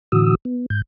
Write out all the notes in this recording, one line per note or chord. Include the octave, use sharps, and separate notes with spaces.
A2 D3 E3 F#4 D#6 E6
B3
G#2 G6